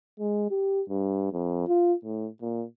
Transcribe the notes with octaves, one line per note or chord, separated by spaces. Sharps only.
G#3
G4
G2
F2
F4
A2
A#2